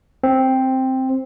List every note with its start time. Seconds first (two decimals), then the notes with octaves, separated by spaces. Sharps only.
0.24 C4